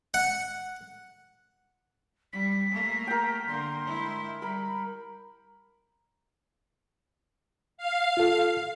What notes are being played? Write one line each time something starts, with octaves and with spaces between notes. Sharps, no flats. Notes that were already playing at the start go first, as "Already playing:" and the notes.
F#5
G3 B6
A3 A#3
A#4 G5
D3 A#3 C6
G#3 E4
G3 A#4 B5
F5
F4 A4